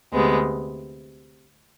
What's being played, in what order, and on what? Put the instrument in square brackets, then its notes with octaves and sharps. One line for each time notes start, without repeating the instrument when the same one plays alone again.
[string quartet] D2 C3 G#3 B3